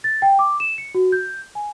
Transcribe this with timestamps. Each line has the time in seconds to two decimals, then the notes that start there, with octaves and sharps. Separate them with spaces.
0.04 A6
0.22 G5
0.39 D6
0.60 E7
0.78 C#7
0.95 F#4
1.12 G6
1.55 G#5